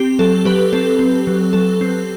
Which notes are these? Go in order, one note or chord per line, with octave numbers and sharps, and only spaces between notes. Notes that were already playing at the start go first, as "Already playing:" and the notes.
Already playing: C4 G4
F#3 A4
F#3 G4 B4
C4 A4
C4
F#3
F#3 A4
C4